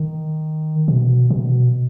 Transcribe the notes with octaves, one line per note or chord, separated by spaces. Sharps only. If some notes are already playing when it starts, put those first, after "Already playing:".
Already playing: D#3
B2
B2